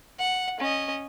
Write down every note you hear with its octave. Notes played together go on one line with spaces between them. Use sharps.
F#5
C#4 D#5